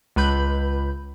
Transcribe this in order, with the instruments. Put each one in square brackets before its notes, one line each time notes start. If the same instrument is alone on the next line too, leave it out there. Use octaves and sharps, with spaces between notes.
[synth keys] C#2 B4 B5 G6